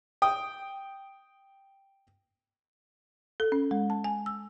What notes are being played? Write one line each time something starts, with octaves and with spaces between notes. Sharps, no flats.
G5 D#6
A4
C#4
G#3
A5
G#5
E6